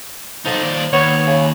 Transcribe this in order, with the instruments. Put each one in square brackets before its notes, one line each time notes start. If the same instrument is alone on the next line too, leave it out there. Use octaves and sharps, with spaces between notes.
[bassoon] F3 [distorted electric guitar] D#4 A4
[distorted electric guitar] D#2 D5
[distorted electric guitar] D#2 [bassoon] B3 [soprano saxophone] C#5
[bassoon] C#3